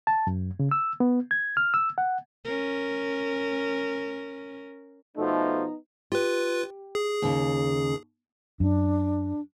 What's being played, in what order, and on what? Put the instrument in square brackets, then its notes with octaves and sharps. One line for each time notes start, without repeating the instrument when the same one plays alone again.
[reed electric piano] A5
F#2
C#3
E6
B3
G#6
F6
E6
F#5
[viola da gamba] C#4 A#4
[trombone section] B2 F3 A3 [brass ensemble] B3 D#4
[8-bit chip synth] F4 B4 [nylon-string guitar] G4
[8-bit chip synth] G#4
[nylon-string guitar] D#2 C#3
[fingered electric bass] F#2 [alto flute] D4